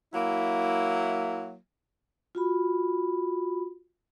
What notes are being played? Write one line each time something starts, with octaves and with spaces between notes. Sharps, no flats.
F#3 A#3 E4
F4 F#4 B5